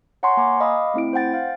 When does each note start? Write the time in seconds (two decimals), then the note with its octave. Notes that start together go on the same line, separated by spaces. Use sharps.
0.23 C#5 F#5 G#5 A#5 C6 C#6
0.37 A#3 G#5 A#5 D6
0.61 D#5 F5 B5 D6 D#6
0.94 A3 C4 E4 D7
1.13 C5 F#5 G5 A6
1.34 F5